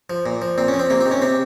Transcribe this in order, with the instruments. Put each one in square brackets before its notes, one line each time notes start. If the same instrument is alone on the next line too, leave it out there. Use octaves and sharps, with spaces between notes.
[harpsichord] F3
A#2
F3
A#2 C4
C#4
F3
C4
C3 A#3
C4
D#3
C#4
C3 C4